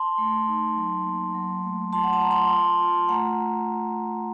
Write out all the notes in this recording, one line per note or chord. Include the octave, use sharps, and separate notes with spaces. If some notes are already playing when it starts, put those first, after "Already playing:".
Already playing: A5 C6
A3
D#4
F#3
A#3
F#3
A3
F4 A5 C6
F#5
A5
F4 A#5
A5 C6
F4
F4
A3 F#5 A#5